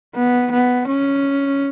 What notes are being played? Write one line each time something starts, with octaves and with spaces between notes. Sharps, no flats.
B3
B3
C#4